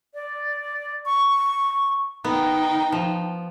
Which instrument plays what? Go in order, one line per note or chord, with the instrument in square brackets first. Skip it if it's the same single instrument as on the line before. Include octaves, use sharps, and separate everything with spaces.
[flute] D5
C#6
[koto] B3 [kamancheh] D#4 G5
[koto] F3